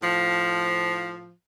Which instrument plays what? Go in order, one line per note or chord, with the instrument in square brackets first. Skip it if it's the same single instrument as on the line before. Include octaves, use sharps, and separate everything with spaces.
[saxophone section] A2 F3